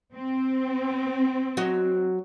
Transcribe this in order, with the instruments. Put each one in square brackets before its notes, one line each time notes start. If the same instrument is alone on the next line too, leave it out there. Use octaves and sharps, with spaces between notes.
[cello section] C4
[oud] F#3 F#4 D#5